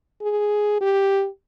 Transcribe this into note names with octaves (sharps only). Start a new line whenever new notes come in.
G#4
G4